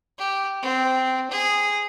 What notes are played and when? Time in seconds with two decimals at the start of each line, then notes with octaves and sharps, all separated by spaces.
0.18 G4
0.63 C4
1.30 G#4